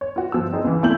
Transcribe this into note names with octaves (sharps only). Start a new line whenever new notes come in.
C#5
F4 F#4
G1 F3 E6
B3 C4 D#4 G#4
C#2 E3
C2 A3 E4 G#5 G6 F#7